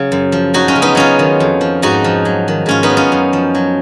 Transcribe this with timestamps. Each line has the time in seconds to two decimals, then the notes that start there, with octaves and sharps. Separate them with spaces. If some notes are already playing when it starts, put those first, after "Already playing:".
Already playing: C#3 F#3
0.12 F#2
0.32 F3
0.54 F#3 D#4 F#4
0.68 C#4 F4
0.76 C#3
0.82 B3 D#4
0.95 F#3 C#4 F4
1.19 D#3
1.40 F2
1.61 F3
1.82 G#2 D#4 F#4
2.04 F3
2.25 F#3
2.48 D#3
2.66 G#2 C#4 F4
2.83 B3 D#4
2.90 F#3
2.97 C#4 F4
3.12 F#2
3.33 F3
3.55 F#3